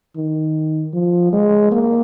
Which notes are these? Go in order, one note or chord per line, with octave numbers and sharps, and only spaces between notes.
D#3
F3
G#3
A#3